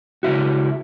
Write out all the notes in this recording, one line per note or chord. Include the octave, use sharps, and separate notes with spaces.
C#2 G#2 E4 F#4